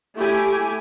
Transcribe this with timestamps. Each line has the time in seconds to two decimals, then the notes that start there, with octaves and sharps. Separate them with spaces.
0.16 A3 E4 G4 G#5